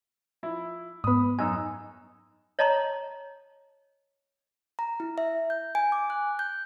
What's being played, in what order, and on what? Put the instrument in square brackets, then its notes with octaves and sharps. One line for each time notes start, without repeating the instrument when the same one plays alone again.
[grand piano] F3 E4
[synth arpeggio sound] G#2 B3 [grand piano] B5 D#6
[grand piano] F#2 D#4 E6 [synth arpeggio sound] G#5
[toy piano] C#5 D#5 A5 A#5 C6
[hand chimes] A#5
E4
E5
G6
G#5
D6
F#6
G6